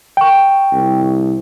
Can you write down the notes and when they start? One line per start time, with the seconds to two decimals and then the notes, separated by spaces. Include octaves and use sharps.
0.17 G5 C#6
0.73 C2